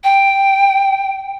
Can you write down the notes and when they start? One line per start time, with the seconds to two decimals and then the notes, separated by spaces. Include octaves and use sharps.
0.04 G5